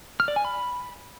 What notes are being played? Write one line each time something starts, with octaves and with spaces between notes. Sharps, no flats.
F6
D5
G#5
B5